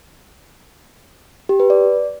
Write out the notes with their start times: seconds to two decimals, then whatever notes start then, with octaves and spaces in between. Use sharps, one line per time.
1.49 G4
1.60 B4
1.70 D5